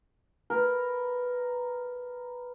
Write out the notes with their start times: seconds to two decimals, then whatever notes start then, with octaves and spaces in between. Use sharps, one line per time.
0.50 A#4 B4